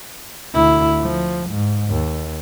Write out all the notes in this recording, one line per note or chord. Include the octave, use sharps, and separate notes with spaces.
D2 E4
F3
G#2
D#2